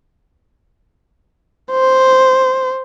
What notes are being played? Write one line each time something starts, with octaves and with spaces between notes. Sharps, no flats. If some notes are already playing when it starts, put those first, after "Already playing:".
C5